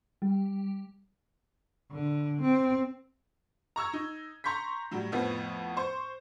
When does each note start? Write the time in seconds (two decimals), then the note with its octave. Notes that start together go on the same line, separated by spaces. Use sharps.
0.22 G3
1.91 D3
2.41 C4
3.76 A#5 C#6 E6 G#6
3.93 D#4
4.44 A#5 C6 C#6 G6 B6
4.91 A2 F#3 G3
5.12 F2 A2 F3 B3
5.77 C5 C#6